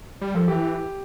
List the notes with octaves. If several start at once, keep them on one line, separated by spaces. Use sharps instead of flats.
G3
F3 A4
E3 G4